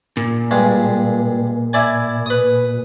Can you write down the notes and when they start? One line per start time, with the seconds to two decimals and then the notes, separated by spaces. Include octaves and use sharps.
0.17 A#2
0.51 G2 G#3
1.73 E4 D5 G#5
2.26 B4 D#6